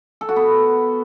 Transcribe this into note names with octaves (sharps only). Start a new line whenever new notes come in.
A4
F#4
B3